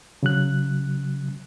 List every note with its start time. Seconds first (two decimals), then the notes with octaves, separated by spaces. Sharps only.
0.23 C#3 F#3 F#6